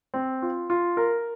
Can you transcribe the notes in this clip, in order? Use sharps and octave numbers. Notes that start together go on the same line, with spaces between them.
C4
F4
F4
A#4